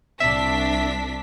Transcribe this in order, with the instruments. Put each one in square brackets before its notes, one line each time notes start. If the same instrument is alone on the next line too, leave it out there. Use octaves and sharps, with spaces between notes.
[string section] C2 D4 B6 [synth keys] E5